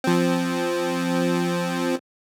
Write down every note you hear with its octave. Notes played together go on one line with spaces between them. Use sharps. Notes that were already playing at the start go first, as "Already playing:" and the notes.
F3 C4